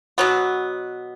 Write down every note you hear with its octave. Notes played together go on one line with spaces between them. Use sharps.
B2 F#3 B3